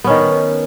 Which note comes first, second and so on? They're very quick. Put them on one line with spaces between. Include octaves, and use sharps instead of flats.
B3 C#4 D#3